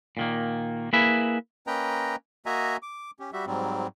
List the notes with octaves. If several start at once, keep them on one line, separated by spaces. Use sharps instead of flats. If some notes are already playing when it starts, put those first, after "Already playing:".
A#2 D#3 A#3
A#3 E4 G#4 B4 E5
A#3 C#4 B4 D#5 G5 A#5
A#3 F#4 D#5 E5 G#5 A#5
D6
C#4 G4
G3 F#4 G4 E5
G#2 F#3 G3 C4